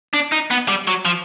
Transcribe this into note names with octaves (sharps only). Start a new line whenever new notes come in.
D4
D#4
B3
G3
F#3
F3